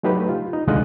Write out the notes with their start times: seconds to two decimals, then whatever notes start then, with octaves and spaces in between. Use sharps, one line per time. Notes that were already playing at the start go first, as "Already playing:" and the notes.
0.03 F#3 A3 D#4 G4 B4
0.29 F4
0.53 D#4
0.67 C2 D3 G#3 F4 D#5 F#6